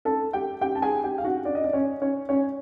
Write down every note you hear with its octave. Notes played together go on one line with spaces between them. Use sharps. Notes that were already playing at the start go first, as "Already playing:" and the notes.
A4 A5
G4 G5
G4 G5
A5
G#4 G#5
G4 G5
F5
F#4 F#5
D4 D5
D#5
D5
C#4 C#5
C#4 C#5
C#4 C#5